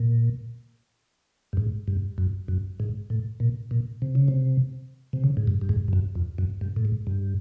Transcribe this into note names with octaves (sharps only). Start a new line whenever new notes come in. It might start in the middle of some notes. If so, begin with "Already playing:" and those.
Already playing: A#2
G2
G#2
G2
F#2
F#2
G#2
A2
A#2
A#2
C3
C#3
C3
C3
C#3
G#2
G2
G2
G#2
G2
F#2
F2
F#2
G2
A2
G#2
G2